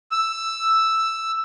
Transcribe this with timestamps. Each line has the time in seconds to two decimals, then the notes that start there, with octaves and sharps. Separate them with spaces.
0.11 E6